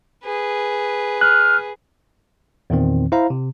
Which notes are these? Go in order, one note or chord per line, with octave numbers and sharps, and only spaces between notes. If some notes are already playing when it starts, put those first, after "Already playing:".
G#4 B4
F6 F#6
E2 A#2 D#3 C4
E4 C5 F5 A#5
C3